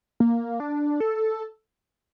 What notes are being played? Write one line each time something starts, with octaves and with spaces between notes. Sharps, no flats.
A#3
D4
A4